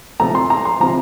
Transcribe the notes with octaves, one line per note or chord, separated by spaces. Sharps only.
C3 F3 A3 A#5
C6
A#5
C6
C3 F3 A#5